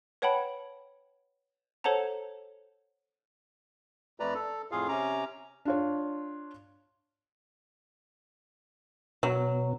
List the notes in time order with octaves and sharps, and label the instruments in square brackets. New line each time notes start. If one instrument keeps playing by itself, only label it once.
[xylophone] B4 C#5 F#5 G5 A5 B5
A4 C5 C#5 F#5 A5 A#5
[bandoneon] F2 A3 B4 D5 A#5
A4
F2 A2 F4 G#4 F5
C3 C#4 A#5 D6
[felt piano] D4 F4 C#5
[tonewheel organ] B2 [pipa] F#3